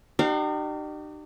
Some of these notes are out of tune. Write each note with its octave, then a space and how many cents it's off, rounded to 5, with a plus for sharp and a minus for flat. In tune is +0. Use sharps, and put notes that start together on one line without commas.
D#4 -45 G4 -30 F5 +0